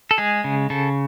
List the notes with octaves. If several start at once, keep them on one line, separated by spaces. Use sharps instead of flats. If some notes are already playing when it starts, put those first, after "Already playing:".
A4
G#3 G#4
C#3
C#3 A4